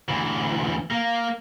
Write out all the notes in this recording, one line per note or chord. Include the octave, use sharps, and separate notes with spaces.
D2 E3
A#3